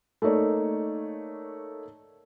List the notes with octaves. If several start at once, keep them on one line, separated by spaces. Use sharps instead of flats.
A3 A#3 D#4 C#5 D5